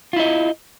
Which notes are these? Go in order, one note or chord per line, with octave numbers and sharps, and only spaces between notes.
E4 F4 D#5